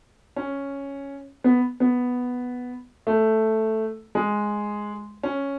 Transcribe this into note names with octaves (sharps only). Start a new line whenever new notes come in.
C#4
B3
B3
A3
G#3
C#4